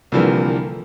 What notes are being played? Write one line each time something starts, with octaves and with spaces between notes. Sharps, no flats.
C2 D3 E3 F3 G3 A#3